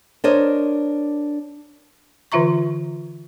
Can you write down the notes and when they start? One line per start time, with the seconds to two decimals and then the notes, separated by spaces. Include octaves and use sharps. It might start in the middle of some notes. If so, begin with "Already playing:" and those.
0.24 D4 A#4 C5 C#5 D#5
2.32 D3 E3 F4 E5 A#5 C#6